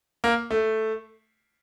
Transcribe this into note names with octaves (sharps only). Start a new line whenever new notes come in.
A#3
A3